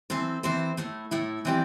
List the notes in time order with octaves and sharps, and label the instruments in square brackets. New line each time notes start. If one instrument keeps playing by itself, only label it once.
[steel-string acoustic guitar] E3 C4 A4 C5
E3 C4 A4 C5
A2 A3 E4
A2 A3 E4
E3 C4 G4 D5